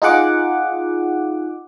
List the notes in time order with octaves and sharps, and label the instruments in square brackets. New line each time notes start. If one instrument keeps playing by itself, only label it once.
[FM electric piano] D#4 F4 G#4 F#5 D6